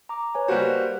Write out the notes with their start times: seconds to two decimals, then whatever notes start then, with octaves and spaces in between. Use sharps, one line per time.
0.09 A#5 D6
0.35 B4 C#5 G#5
0.48 G3 A#3 F#4 C5